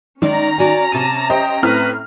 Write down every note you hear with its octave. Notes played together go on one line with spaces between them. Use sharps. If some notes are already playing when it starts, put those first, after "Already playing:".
D#3 G#3 C#4 D5 A#5
F#4 D5 G#5
C3 A5 D#7
G4 C5 D#5 E5 G5
A2 C4 B4 F6